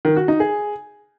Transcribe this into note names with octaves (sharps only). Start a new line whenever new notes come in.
D#3
F#4
D#4
G#4